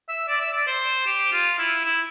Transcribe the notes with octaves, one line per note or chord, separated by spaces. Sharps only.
E5
D5
E5
D5
C5
G4
F4
E4
E4